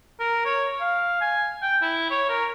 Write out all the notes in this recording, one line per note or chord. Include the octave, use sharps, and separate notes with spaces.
A#4
C#5
F5
G#5
G5
E4
C#5
A#4